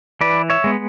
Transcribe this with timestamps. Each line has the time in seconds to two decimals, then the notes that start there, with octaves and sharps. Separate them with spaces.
0.21 E3 B4 D5
0.50 C#5 E5
0.64 G#3 B3